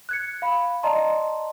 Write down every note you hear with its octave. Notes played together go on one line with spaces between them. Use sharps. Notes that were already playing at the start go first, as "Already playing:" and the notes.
F#6 G#6 C#7
F5 B5
D5 D#5 A5 A#5 C6